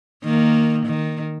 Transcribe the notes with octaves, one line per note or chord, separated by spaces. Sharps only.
D#3 A#3
D#3